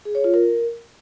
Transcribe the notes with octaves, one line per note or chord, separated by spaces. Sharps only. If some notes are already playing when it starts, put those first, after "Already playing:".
G#4
C#5
F4
A#4